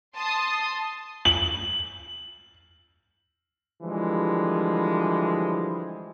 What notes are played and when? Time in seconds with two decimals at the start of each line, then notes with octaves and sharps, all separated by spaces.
0.16 A5 C6 D#6
1.25 F#7
3.82 D3 E3 F3 G3 G#3